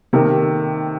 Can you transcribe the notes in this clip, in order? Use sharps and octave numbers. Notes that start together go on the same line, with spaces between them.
C3 D#3 A#3 D#4 A4